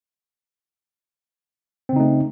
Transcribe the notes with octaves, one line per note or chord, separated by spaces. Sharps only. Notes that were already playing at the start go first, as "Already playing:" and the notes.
C#3 A3 C4 D#4